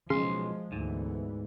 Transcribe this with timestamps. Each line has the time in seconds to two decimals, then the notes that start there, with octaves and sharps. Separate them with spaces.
0.10 B1 C#3 F3 G#3 C6
0.72 D2 G#2 E3 B3